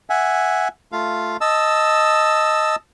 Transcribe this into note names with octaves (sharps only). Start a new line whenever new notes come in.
E5 F#5 G#5
A3 F4 F5
D#5 A5 E6